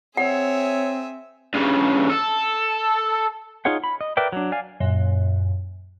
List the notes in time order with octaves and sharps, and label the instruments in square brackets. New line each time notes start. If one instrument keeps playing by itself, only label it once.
[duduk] C4 [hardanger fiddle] G#4 E5 [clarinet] C#5 [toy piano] F#5
[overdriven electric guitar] G2 C#3
A4
[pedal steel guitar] D#4 F4 G#4 C#5 F#5
B5
D#5
A#4 B4 D5 E5 G5
F#3 D4
D5 F5 G#5
[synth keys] F#2 A#2